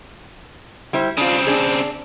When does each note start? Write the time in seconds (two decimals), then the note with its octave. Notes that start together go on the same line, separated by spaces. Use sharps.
0.93 G3 E4 C5
1.17 C#3 C4 D4 F4
1.47 D4 G#4